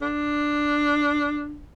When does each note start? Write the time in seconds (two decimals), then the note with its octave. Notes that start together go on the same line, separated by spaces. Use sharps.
0.01 D4